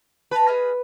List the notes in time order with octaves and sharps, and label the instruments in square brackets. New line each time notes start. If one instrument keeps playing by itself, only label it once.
[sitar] B4 [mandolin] A5 A#5
[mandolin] G#4 D#5 F6